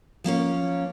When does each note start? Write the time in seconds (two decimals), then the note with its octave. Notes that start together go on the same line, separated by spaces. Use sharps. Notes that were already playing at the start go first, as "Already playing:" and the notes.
0.24 F3 A#3 C#4 C#5